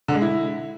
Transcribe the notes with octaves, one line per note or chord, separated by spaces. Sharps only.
D3
G#3
E4